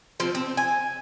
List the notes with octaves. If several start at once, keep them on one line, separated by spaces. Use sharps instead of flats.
F3 C4
C4
G#5